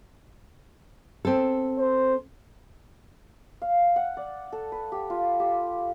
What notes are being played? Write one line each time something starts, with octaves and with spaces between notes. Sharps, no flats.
C4 A4
C5
F5
F#5
D5
A4
B4
G4
F4
G4